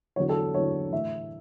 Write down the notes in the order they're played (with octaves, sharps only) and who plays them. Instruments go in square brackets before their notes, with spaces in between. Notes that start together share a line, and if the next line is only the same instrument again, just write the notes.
[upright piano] E2 D3 F#3 C#5
A4
E2 D3 F#3 C#5
A2 E3 E5